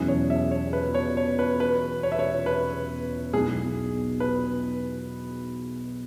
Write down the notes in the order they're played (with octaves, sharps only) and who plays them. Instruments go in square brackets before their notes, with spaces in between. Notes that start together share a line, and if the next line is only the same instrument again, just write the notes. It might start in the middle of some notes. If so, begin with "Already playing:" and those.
Already playing: [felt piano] E2 B2 F#3 C#4 E4 [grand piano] G#4
[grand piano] C#5
E5
C#5
B4
C#5
C#5
B4
B4
C#5
E5
C#5
B4
[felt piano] B1 B2 F#3 B3 E4 [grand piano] G#4
[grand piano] B4